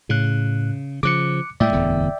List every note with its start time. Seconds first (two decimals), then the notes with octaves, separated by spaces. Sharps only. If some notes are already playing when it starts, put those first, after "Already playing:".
0.09 A2 C#3 F#6
1.03 C#3 F3 D6 F#6 C#7
1.60 A2 G#3 D5 E5 G5
1.73 D1 E2 D3